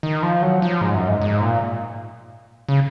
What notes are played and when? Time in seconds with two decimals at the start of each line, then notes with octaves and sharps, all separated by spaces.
0.03 D#3
0.23 F3
0.42 F#3
0.62 F3
0.81 G#2
0.95 F#2
1.08 G#2
1.22 G#2
1.41 A#2
2.69 C#3